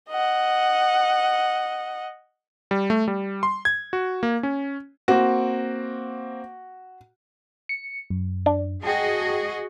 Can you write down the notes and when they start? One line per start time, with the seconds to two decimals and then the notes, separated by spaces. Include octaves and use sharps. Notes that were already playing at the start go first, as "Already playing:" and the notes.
0.10 D#5 F#5
2.71 G3
2.90 A3
3.08 G3
3.43 C6
3.65 G#6
3.93 F#4
4.23 A#3
4.43 C#4
5.08 A#3 C4 F#4
7.69 C#7
8.10 F#2
8.46 D4
8.83 F#4 G#4 D#5 G5 A5